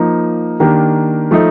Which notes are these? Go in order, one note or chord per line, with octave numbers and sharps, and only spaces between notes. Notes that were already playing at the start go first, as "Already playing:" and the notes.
Already playing: F3 A#3 D#4
D#3 A#3 D4 G4
F3 A3 D#4